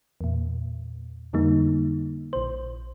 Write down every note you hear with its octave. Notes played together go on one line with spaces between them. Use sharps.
E2 A#2
F2 D3 G3 A#3 D#4
A#1 C5